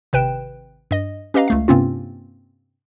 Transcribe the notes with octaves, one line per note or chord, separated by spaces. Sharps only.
G#1 C3 B4 G5 E7
G2 D#5
C#4 G4 B4 D#5 F5 A#5
C#2 A3 F5
G2 C3 A#3 C4 C#4 F4